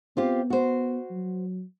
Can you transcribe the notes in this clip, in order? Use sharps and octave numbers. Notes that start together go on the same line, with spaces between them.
B3 C4 F4 G4
F#4 C5
F#3